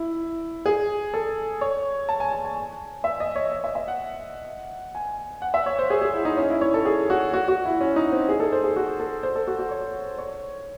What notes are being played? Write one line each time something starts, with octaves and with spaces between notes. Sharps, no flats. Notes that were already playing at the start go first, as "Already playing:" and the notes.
Already playing: E4
G#4
A4
C#5
A5
G#5
G#5
G#5
E5
D#5
C#5
D#5
E5
E5
F#5
G#5
F#5
E5
C#5
C5
G#4
G#4
E4
D#4
C#4
E4
C#5
A4
G#4
F#4
F#4
F#4
E4
C#4
D#4
C4
G#4
A4
C5
G#4
F#4
A4
C5
A4
F#4
F#4
C#5
C#5